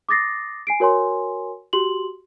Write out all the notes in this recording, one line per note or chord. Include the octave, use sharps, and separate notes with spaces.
D6 D#6 A6 A#6 C7
G#5 C7 D7
F#4 A#4 C#5 G#5 C6
F#4 G4 C6 F#7